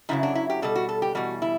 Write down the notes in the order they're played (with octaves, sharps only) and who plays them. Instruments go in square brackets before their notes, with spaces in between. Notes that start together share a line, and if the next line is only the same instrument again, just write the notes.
[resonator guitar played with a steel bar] F#2 C#3 F#3 E4
D4
E4
G4
B2 G3 A4
F#4
A4
G4
E2 B2 G3 F#4
E4